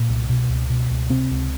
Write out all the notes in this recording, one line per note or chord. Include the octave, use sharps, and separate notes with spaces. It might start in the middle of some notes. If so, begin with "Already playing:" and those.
Already playing: A#2
C2
B2
C#2
B2
C#2
C3 C4
C#2